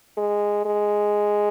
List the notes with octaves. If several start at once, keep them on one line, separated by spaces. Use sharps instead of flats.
G#3
G#3